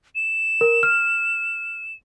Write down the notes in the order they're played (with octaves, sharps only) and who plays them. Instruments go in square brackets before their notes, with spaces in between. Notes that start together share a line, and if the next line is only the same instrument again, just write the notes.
[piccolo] E7
[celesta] A#4
F6